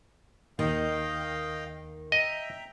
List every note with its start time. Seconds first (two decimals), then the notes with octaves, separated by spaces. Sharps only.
0.59 D#2 D#3 D#5 F5 G5
2.12 D#5 E5 G5 A#5